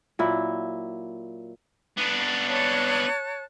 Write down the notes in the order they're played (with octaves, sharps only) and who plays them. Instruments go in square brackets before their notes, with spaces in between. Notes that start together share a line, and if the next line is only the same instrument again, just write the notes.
[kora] A#2 F#3 E4
[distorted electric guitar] B3 D4
[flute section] C#5 A5 F#6